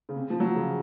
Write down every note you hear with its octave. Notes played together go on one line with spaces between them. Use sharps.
C#3
C3
F3
F#3
F3
C#3